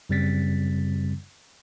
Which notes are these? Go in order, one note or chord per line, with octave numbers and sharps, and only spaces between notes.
F#2 C#3 G3 C4 A6 B6